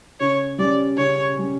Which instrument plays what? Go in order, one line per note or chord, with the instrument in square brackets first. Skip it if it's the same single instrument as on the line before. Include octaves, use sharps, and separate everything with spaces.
[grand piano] C#3 [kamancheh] C#5
[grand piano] G3 C#4 [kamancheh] D5
[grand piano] C#3 [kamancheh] C#5
[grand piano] G3 C#4